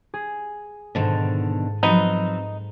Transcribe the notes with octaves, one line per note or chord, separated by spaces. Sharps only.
G#4
G#2 B2 D3 D#3 A4
F3 F#3 B3 C4 D#4